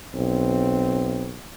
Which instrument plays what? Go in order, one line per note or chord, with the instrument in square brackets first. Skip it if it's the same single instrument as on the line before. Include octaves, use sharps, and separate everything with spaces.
[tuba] B1 [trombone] C4